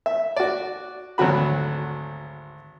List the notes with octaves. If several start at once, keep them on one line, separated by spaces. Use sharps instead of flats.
E5
F#4 D5
G#1 D2 F#3 F#4 B5